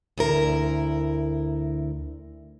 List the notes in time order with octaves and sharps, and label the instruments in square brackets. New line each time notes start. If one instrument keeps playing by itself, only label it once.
[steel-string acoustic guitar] D2 E4 A#4